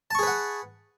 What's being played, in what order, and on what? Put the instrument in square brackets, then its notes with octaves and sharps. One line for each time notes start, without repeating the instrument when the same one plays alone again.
[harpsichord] A5
C#6
G#4
B4
F#5